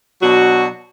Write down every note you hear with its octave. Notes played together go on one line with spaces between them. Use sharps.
B2 F#3 D4 F#4